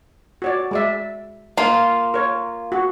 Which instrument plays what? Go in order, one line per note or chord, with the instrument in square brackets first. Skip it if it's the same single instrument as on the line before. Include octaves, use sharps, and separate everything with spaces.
[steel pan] F#4 C#5 D5
G#3 D5 E5
[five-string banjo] A#3 [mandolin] F4
[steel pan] A#4 C#5
F#4